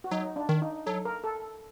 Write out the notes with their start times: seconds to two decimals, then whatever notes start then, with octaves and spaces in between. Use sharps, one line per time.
0.04 F#4
0.11 F#3 D#4
0.36 D4
0.49 D#3
0.62 D#4
0.86 F#3 A4
1.05 A#4
1.24 A4